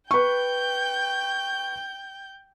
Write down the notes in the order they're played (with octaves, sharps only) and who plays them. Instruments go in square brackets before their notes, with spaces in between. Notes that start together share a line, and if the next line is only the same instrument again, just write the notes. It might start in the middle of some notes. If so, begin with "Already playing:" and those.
[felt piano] B4 C#6 [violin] G5 G6